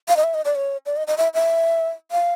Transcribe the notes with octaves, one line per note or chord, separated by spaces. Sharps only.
F5
D#5
E5
D#5
D5
C#5
D5
D#5
D#5
E5
E5
F5